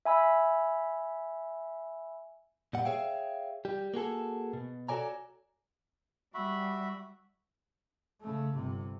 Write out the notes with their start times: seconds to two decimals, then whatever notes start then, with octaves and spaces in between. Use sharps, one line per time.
0.05 E5 G#5 B5 E6
2.73 A#2 G3 F#5
2.85 G#4 C#5 E5 F5 G5
3.65 G3 G4
3.94 A#3 F#4 G#4 A4
4.53 B2
4.89 F#4 A4 C#5 D5 G#5 A#5
6.34 G3 F#4 E5 B5
8.22 C#3 A3
8.54 G1 C3